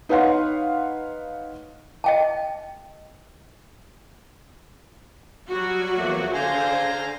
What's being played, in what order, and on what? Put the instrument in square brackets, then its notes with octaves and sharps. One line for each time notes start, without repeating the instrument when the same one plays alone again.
[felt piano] D#4 B4 C#5 F5 F#5 C6
[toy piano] D#5 G5 A5
[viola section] F#3 F#4 [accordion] G3
[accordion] E2 A3 A#3
[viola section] D3 C5 [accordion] F5 G#5 A#5